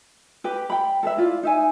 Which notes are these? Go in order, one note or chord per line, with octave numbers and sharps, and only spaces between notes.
G4 B4
G5 B5
A4 B4 E5
E4 F4 D5
D#4 E5 G#5